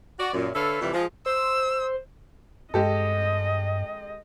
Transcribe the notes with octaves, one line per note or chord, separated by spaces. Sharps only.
F#4 D5
F#2 A#2
D3 A4 B4 C#5 E5 F5
F2 C3 E3 G3
F3 G#3 F4
C5 E6
G2 G#3 G4 A4 D#5